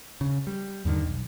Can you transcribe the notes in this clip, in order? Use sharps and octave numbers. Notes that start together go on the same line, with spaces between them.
C#3
G3
E2 G2 D3 D#3
B1